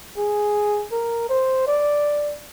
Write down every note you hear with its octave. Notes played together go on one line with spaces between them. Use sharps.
G#4
A#4
C5
D5